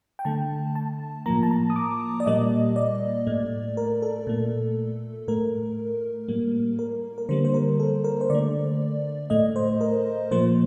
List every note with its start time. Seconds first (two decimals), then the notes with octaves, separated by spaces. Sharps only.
0.19 G5
0.25 D3 A3 A5
0.75 A5
1.26 A2 F3 A#3 A#5
1.43 A5
1.51 A#5
1.70 D#6
1.76 D6
2.20 D5
2.26 A#2 G3 A#3 D#5
2.76 D5
3.27 A2 A3
3.77 A#4
4.02 A4
4.27 A#2 A3
5.28 A2 A3 A#4
6.28 A2 G3 A#3
6.79 A#4
7.18 A#4
7.29 D3 G3 A#3 C5
7.45 C5
7.54 A#4
7.80 A4
8.04 A#4
8.21 C5
8.30 D3 A3 D5
9.30 A2 A3 D#5
9.56 C5
9.81 A#4
10.31 A#2 F3 A#3 C5